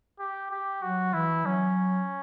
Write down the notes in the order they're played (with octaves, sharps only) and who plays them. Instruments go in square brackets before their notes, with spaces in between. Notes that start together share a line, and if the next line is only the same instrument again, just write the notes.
[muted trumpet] G4
G4
[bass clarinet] F#3 [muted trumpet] F#4
[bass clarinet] E3 [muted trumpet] E4
[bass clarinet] F#3 [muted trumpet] C#4